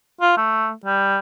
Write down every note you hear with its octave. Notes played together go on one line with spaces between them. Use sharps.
F4
A3
G3